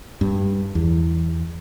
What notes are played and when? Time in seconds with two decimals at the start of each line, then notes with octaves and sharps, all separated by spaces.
0.21 G2
0.75 E2